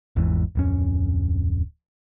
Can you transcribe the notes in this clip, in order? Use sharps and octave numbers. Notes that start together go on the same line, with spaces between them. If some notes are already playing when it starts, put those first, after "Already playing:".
G#1 E2 G#2 E3
D1 F2 C#4